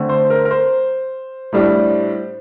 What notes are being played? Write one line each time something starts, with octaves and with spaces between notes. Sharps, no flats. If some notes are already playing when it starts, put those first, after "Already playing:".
Already playing: D3 A3 C4
C5
A#4
A#4
C5
A2 G3 D4